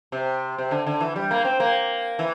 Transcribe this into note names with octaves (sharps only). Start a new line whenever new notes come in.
C3
C3
D3
D3
E3
G3
A#3
C4
A#3
E3